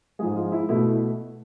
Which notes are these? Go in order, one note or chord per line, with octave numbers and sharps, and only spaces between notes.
G#2 F3 G#3 G#4
F4
E4
B2 A3 E4